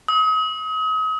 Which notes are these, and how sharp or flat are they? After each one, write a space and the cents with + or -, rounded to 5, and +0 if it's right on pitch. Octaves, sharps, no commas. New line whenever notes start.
D#6 +35